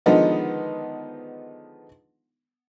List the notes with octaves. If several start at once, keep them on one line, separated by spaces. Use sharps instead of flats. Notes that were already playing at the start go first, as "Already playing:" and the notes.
D3 D#3 F3 G#3 B3 D#4